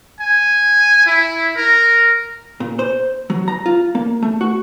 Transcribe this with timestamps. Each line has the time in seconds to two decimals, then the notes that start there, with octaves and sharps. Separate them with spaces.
0.21 G#5
1.07 E4
1.56 A#4
2.60 A#2
2.79 C5
3.30 F#3
3.48 A#5
3.66 F4
3.95 A#3
4.22 A3
4.41 F#4